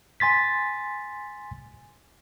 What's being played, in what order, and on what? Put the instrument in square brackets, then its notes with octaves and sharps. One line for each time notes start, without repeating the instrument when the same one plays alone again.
[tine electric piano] G#5 C6 A6 B6